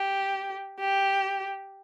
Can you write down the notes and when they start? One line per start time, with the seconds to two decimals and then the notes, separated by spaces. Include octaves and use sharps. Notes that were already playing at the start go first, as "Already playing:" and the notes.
Already playing: G4
0.79 G4